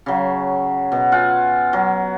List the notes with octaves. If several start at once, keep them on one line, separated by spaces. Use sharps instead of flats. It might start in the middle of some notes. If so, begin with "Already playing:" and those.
C#3 F#3
B2
F4 F#5 G#5
F#3